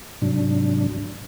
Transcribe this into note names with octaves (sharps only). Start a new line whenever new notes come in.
G#2 C3 F#3 D4